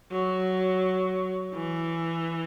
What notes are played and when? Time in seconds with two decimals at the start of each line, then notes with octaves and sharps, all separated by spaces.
0.12 F#3
1.54 E3